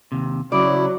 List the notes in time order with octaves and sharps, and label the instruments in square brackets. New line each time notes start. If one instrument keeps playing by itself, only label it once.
[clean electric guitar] D#2 C3
[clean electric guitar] C#3 [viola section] F#3 [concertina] E4 [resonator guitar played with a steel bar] D5